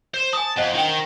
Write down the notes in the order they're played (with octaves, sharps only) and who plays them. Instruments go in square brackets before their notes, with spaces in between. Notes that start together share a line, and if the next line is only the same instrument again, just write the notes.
[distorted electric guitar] C5
[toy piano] G#5 D#6 [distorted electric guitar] A5
[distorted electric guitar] F2 [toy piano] C5 D#5 F#5
[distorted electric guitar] D#3 [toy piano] D4 G5